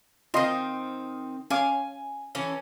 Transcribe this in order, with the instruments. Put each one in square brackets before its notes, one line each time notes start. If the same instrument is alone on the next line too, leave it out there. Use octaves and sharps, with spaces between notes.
[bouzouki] D#3 C4 [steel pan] F4 D#5 C6
[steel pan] C#4 F5 D6 [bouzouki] G#5
[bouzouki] E3 C#4 A4